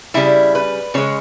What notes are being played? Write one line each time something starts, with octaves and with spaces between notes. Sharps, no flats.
C#3 G3 E4
B4
C#3 G#3 C#5